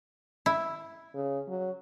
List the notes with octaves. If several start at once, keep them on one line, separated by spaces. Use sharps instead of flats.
E4
C#3
F#3